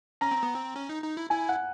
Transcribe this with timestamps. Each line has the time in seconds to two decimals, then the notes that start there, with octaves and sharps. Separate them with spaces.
0.21 C#4 A#5
0.31 C4
0.43 B3
0.54 C4
0.76 C#4
0.89 D#4
1.03 D#4
1.17 E4
1.30 E4 G#5
1.49 F#5